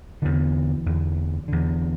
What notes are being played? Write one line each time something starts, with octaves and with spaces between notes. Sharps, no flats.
E2 D3 E3
E2 D3
E2 D3